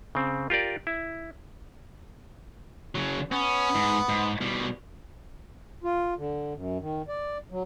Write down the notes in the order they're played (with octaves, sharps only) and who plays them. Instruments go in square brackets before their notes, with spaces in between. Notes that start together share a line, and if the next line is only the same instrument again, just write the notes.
[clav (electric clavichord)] C#3 C4
F4 G4 A#4 D5
E4
[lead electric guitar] C#3 F#3
[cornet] B3 [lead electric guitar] C#4
[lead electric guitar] G#2
G#2
B2 G3
[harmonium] F4
D3
F#2
D#3
D5
F#3